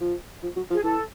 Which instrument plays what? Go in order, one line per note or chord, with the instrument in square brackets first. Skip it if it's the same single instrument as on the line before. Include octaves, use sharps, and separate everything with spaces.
[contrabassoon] F3
F3
F#3
F3
[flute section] G#4
[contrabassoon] E3 [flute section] A4